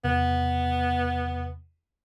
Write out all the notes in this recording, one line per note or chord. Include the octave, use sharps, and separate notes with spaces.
E2 C3 B3